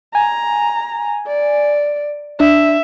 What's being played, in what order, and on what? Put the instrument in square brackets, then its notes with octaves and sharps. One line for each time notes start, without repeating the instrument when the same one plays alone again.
[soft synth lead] G#5 [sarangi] A#5
[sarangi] D5
[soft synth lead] D4 [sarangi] E5